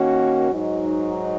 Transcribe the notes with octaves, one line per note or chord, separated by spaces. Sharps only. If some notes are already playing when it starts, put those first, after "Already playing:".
Already playing: D#3 A#3 C#4 F#4
G#2 F#3 D#4 F#4